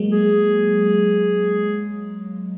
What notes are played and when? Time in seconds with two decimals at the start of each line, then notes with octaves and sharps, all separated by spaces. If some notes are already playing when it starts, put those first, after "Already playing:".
Already playing: F#3 G#3 A#3
0.12 G#4